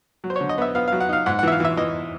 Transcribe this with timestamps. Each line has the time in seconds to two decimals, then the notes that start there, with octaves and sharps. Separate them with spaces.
0.24 F#3
0.30 C5
0.36 C#5
0.41 D3
0.49 D#5
0.58 B3 E5
0.75 B3 F5
0.88 F5
0.92 F#3
1.00 F#5
1.09 D#4 F5
1.26 G#2 F#5
1.39 F#5
1.43 E3 E5
1.52 F5
1.60 E3 E5
1.77 E3 D#5